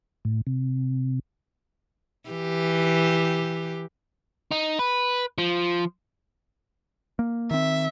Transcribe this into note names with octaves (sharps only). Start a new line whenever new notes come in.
A2
C3
E3 G4
D#4
B4
F3
A#3
D#3 C4 E5